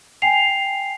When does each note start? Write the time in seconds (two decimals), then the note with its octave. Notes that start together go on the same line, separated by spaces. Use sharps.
0.22 G5 G#5 C7 F7